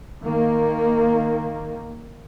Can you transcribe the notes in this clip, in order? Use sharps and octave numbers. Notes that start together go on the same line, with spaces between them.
D#3 A#3